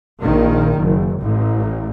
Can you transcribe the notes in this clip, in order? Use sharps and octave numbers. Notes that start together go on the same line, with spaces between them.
A#1 D#3
F#1
A1